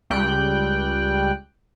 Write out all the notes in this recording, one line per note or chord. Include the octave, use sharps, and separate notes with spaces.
C#2 G3 G5 F#6